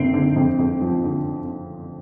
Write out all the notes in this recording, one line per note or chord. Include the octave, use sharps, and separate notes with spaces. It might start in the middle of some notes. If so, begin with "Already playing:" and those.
Already playing: F#1 D3 C4
D3
F2
F2
F3
D3